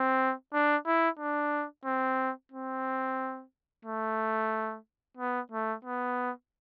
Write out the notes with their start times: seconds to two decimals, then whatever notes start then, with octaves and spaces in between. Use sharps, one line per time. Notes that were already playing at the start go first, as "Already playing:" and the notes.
Already playing: C4
0.54 D4
0.86 E4
1.19 D4
1.85 C4
2.52 C4
3.85 A3
5.17 B3
5.52 A3
5.85 B3